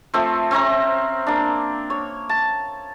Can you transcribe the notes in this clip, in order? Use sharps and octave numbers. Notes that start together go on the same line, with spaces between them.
F3 A3 C4
C4 C#4 E5 A#5
A#3 D4
C#5
A5